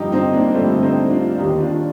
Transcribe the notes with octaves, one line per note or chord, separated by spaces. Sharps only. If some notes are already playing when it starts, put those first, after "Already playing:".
Already playing: G2 D3 F3 D#4 G4
C4 D#4
A#3 D4
G2 D3 F3 A3 C4
C4 D#4
D4 F4
D#2 D#3 D#4 G4
D4 F4